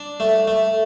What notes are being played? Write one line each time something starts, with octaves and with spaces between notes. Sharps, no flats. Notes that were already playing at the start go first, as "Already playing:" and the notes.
Already playing: D4
A3
A3